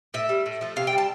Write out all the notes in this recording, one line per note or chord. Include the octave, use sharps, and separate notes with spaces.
A2 E5
G3
A2
F3 A3
C3 F5
G5
G3
A5